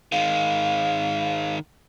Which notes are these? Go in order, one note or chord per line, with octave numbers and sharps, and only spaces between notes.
D#3 G#3 F5